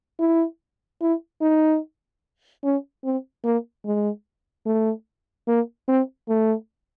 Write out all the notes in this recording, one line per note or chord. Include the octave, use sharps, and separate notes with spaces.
E4
E4
D#4
C#4
C4
A#3
G#3
A3
A#3
C4
A3